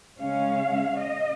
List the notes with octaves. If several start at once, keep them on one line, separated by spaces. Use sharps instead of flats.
C#3 G#3 C#4 F5
D#5